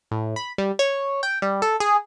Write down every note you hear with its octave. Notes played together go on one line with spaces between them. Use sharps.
A2
B5
G3
C#5
G5
G3
A4
G#4